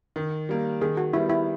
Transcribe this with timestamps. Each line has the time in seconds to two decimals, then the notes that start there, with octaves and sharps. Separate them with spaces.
0.16 D#3
0.49 G3 A#3
0.81 D#3 G#4
0.97 F#4
1.13 G3 B3 E4
1.30 E4